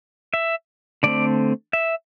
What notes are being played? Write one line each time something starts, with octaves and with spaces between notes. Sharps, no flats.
E5
D3 A3 C4 D5
E5